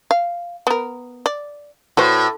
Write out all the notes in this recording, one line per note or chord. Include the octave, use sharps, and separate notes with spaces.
F5
B3 A#4
D5
A2 F#4 B4 C5